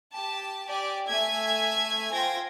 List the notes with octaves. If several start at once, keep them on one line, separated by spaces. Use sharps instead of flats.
G4 A5
G4 D5 G#5
A3 E5 G#5 G#6
F4 C5 G5 C6 G#6 A#6